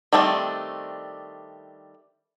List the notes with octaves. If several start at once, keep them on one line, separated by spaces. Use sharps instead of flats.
D#3 G3 A3 C4 D4